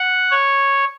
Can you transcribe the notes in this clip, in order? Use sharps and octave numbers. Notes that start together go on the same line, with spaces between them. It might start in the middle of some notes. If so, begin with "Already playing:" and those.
Already playing: F#5
C#5